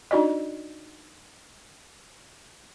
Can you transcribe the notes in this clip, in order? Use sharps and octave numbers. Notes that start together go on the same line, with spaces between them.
D4 D#4 F#4 D5 D#5